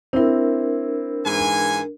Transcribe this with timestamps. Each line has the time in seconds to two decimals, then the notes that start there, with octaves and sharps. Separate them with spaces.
0.13 C4 D4 E4 A#4
1.25 G#2 E3 G#5